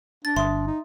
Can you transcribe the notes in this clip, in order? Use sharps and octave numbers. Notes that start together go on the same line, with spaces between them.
D4 A6
G1 E5 C6 D#6
D#4